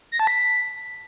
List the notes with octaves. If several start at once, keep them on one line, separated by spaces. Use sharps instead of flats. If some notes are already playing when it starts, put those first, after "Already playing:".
A#6
A5
B6